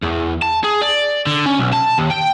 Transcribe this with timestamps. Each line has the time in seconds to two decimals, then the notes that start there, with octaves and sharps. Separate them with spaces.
0.02 E2
0.42 A5
0.64 G#4
0.82 D5
1.27 D3
1.46 C#4
1.59 B1
1.73 A5
1.98 D#2
2.10 G5